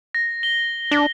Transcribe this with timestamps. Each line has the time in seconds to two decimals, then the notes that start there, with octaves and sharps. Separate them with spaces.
0.15 A#6
0.43 G7
0.91 D4